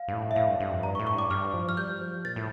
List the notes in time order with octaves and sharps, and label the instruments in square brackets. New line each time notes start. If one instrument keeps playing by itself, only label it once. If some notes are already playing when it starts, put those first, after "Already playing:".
Already playing: [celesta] F5
[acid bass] G2
A2
[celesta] E5
[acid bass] A2 [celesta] F5
[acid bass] G2
G2
F2
[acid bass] G2 [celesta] A#5
[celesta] C#6
[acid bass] A2
[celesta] C#6
[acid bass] G2 [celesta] D6
[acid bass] G2 [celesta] F6
[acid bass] F3
[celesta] F6
[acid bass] G3 [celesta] G6
[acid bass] F3
[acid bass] A#2 [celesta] A6
[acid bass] A2